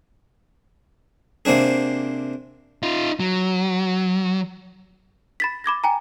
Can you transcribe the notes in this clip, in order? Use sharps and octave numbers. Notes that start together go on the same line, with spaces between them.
C3 A#3 C4 D4 G#4
D#4 F4
F#3
B5 A6 B6
B5 D6 G#6 A#6
G5 G#5 A#5